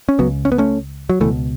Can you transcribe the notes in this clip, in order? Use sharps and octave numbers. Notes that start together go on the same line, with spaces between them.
C#4
C#2 C#3 F#3 B3
C#4
B3
A3 C#4
F#3
C#2 B2 E3 A3